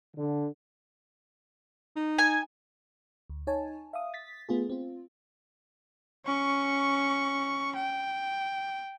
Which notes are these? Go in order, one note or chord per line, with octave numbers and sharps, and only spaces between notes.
D3
D#4
G#5
D2
D#4 C#5 G#5 A5
E5 F5 D#6
A6 B6
A3 B3 F4 G#4
C4 F4
C#4 C#6
G5